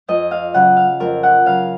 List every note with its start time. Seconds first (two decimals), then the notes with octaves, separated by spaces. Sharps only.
0.08 F2 D#5
0.31 F5
0.54 C#3 F#3 F#5
0.77 F5
1.00 F2 A#4
1.23 F#5
1.46 C#3 F#3 F5